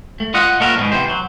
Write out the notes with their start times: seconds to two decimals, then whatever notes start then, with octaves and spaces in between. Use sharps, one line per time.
0.20 A3
0.34 F4 D#5 F#5
0.60 A#2 A3 B3 A4 A#4
0.78 G#2 B2
0.92 C3 E3 C5
1.10 F#3